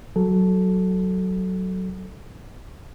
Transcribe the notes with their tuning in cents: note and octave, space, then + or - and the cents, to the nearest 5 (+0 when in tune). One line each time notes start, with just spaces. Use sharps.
F#3 +10 A4 -10